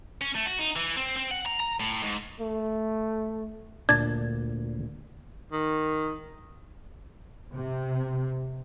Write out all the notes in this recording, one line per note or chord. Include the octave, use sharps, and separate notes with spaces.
C#4
A3
F#4
D#4
E3
C4
C4
F#5
A#5
A#5
A2
G#2
A3
D2 A#2 D4 A5 G#6
D#3
C3